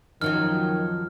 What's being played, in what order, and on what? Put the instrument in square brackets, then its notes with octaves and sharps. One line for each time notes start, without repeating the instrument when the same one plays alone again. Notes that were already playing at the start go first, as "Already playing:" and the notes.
[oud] F#2 F3 F#3 [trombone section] D#3 [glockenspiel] F6